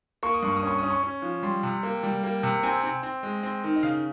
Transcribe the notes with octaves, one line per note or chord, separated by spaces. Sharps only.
A#3 C#6
D#6
G2 C#6
D#6
C#4 C#6
C#4 D#6
C#6
C#4
F3
G3 C6
C3
A#3
G3
A#3
C3
C4 G#5
C4
C4
G#3
C4
D#3
D#5
C#3 F5